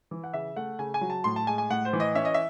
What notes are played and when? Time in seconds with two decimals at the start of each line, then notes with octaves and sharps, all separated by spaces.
0.11 E3
0.24 F#5
0.33 C#3 E5
0.56 A3 F#5
0.79 C#3 G#5
0.94 G#5
1.01 F#3
1.10 A5
1.24 A2 C6
1.36 A5
1.47 G#3 G#5
1.58 G#5
1.70 A2 F#5
1.85 C5
1.93 E3
2.00 D#5
2.15 C#4 E5
2.25 D#5
2.34 E5